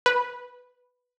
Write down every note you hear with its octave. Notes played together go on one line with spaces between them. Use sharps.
B4